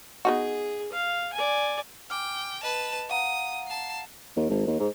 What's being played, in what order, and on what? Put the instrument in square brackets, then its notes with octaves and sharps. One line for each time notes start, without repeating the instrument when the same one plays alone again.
[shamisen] B3 D#4 F#4 [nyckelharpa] G#4
[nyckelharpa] F5
D5 G#5
[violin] G5 [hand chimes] G#5 D6 F6
[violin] B4 A5 [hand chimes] D#5
[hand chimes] F5 F#5 A#5 [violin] D#6
[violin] A5 C7
[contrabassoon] D#2
G#1
D#2
G#2